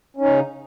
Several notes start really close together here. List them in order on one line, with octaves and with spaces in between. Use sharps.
C#4 D#4 C#3